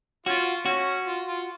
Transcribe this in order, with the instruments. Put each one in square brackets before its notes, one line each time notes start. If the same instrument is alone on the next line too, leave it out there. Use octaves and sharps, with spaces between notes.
[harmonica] C#4 F4 [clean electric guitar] F#4
[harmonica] C#4 [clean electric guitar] F#4
[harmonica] F4
F4